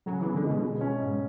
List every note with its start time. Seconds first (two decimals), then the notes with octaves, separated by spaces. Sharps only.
0.06 C#3 F#3
0.21 E3 B3
0.35 D3
0.44 B2 G#3
0.62 G#3
0.81 C#4
1.00 G#2